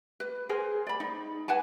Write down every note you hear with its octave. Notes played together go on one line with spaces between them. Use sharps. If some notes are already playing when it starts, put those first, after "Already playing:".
B4
G#4 A#4 C5 G#5
D5 B5
D#4
B4 F#5 G#5 A5